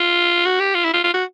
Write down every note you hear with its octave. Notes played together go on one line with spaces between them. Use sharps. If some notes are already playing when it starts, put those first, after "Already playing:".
Already playing: F4
F#4
G4
F4
E4
F4
F4
F#4